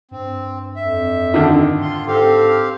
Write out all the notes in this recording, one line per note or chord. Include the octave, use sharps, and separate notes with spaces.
G2 C4
F2 E5
D3 D#3
G#2 F4 C6
C4 G4 A4 F5